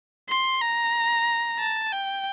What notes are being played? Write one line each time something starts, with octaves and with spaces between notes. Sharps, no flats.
C6
A#5
A5
G5